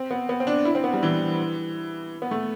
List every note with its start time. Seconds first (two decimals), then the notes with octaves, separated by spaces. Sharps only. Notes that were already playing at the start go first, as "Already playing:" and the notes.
Already playing: C4
0.11 B3
0.29 B3
0.40 C4
0.47 D4
0.65 E4
0.75 C4
0.84 B3
0.93 G3
1.03 E3
2.22 B3
2.31 A3